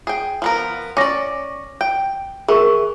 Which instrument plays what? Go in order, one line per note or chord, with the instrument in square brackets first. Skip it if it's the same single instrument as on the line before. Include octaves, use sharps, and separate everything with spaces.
[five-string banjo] G#4 G5
F3 B3 A#4
[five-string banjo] C#4 D5 [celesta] D6 A#6
[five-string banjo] G5
[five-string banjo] E3 [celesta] G#4 A#4 C#6